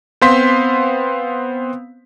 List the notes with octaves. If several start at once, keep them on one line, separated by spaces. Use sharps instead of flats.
B3 C4 C5 F5 C6 B6